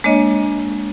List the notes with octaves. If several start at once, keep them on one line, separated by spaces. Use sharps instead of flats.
G#3 A#3 D4 C#5 D#5